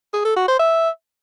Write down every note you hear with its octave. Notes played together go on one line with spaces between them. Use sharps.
G#4
A4
F#4
C5
E5